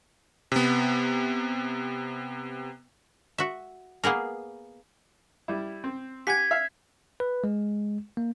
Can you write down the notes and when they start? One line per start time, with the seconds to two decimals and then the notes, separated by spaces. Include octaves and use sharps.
0.52 C3 B3
3.38 F#4 E5
4.04 A#3 B3 G#4 A#4
5.48 G3 E4
5.84 C4
6.27 G4 F#5 G#5 G#6 B6
6.51 E5 F5
7.20 B4
7.44 G#3
8.17 A#3